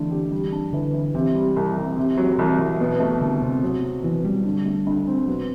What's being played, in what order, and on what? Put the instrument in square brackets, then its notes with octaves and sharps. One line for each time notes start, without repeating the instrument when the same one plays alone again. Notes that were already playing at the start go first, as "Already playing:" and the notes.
Already playing: [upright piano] D3 A3 E4 [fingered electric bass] E3
[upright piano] G4
G3
D4
[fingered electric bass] D3 [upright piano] E3
[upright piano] E3
[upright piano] C3 [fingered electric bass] E3
[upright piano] G3
C2
C2
C3
F#3
[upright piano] C2 [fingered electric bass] E3
[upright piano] C2
B2
A3
[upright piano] C2 [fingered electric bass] D3
[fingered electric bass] C3 [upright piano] C4
[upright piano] F#3
C4
[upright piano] B2 [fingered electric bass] E3
[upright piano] B2 [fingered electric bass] G3
[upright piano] D3
A3
D2
C4
[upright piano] B2 [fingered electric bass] F#3